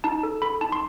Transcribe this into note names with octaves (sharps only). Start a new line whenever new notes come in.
D#4 A5
A4
A4 B5
D#4 A5
C6